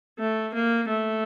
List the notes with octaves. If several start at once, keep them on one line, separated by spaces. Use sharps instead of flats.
A3
A#3
A3